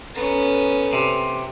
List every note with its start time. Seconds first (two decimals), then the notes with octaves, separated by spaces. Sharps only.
0.15 B3 C#4 A4 A#5
0.93 C3